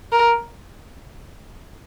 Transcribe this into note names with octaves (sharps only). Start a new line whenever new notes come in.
A#4